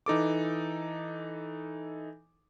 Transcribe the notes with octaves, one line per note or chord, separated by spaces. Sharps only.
E3 D#4 A4 D6